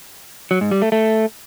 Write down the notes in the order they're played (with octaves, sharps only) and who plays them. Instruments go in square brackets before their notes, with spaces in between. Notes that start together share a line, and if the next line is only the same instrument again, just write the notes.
[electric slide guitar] F#3
G#2
G3
A3
A3